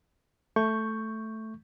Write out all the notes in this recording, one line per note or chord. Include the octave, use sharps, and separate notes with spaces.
A3 C#6 G6